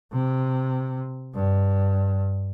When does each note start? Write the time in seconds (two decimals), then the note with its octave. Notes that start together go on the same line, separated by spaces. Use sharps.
0.13 C3
1.35 G2